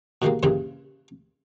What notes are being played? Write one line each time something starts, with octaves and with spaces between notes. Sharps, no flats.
B2 D#3 G3 G#3 A#3
G2 A#2 C#3 E3 G3